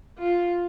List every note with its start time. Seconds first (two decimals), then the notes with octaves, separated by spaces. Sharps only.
0.18 F4